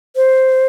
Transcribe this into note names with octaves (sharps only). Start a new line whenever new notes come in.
C5